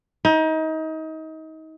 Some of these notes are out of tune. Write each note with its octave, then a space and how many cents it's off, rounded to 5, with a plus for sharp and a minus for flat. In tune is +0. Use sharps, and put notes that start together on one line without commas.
D#4 +30